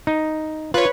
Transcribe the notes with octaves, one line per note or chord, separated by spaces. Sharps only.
D#4
F4 B4 C#5